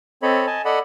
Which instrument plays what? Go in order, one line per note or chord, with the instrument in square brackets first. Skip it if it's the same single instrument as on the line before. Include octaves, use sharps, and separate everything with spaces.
[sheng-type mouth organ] C4 A4 C#5 D#5 B5
D#5 G#5 A5
A4 D5 D#5 F#5 B5